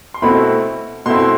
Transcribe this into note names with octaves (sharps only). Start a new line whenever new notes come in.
C6
B2 A3 C4 E4 B5
B2 A3 C4 E4 C6